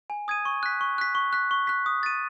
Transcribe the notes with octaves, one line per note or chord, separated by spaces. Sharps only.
G#5
D#6 G#6 D#7
C#6
F#6 B6
C#6
F#6 B6
C#6
F#6 B6
C#6
F#6 B6
D#6
A6 D#7